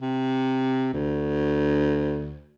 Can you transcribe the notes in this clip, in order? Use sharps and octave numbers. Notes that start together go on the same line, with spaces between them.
C3
D2